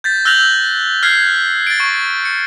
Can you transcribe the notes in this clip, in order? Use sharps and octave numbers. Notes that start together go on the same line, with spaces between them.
G6 A6 B6
E6 F#6 G6 A#6 F7 F#7
F6 F#6 G#6 B6 C7
A6 D7
C#6
C#7